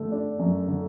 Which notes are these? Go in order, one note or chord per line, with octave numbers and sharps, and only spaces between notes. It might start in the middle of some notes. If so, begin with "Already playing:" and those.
Already playing: D3 A3
D4
F#2
D3